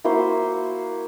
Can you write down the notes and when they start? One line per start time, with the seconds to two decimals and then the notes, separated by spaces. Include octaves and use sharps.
0.04 A#3 E4 F#4 C5